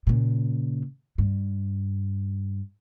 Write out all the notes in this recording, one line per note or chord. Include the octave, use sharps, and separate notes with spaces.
A#2 C#3
G2